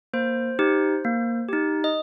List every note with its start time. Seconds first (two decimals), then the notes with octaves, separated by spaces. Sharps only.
0.13 A#3 C5
0.59 D#4 G4
1.05 A#3
1.48 D#4 G4
1.84 D#5